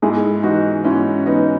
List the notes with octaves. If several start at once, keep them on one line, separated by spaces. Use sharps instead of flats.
G#2 E4 G#4
E3 D#4 F#4
G#2 C#4 E4
E3 B3 D#4